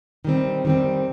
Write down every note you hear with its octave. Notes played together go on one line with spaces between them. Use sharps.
D#3 G3 C4
D#3 G3 C4